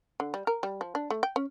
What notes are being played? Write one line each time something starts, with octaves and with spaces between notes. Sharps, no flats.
D3
G3
A#4
G3
F3
D4
A3
G5
C#4